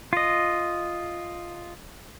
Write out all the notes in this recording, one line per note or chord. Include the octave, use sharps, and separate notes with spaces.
F4 D#5